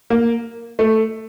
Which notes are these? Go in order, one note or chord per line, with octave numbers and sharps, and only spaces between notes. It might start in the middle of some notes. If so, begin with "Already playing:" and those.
A#3
A3